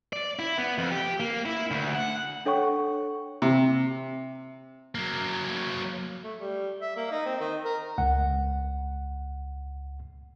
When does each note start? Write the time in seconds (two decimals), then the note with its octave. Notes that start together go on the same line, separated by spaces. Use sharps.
0.13 D5
0.39 E4
0.58 B3
0.78 F2
0.91 G4
1.20 A#3
1.46 E4
1.71 D2
1.95 F#5
2.45 D4 A4 C#5 F#5 G5 C#6
3.42 C3
4.95 F#3 A#3
6.24 A3
6.40 G3
6.81 E5
6.97 A#3
7.11 D#4
7.26 C4
7.40 D#3
7.65 A#4
7.98 C#2 F#5